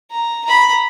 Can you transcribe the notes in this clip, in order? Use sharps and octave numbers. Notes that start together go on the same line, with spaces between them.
A#5
A#5 B5